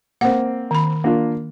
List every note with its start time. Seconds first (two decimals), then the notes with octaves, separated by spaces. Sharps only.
0.21 A#3 C4 F#5
0.71 D#3 B5
1.04 A#3 D4 F4